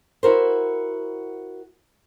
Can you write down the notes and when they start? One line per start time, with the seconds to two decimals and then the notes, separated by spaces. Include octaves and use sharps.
0.23 E4 F#4 A#4 C5